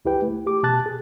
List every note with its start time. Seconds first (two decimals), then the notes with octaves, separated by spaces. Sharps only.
0.05 C#2 E4 G4 B4 G5
0.22 A3
0.47 G4 D6
0.63 B2 G4 A5 F#6 A6
0.86 G#4